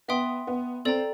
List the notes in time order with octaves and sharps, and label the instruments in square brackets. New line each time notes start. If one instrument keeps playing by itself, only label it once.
[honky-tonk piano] B3 [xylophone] E5 G5 C6 D#6
[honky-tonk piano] B3
[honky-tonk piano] C4 [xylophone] A4 D5 G5 A#5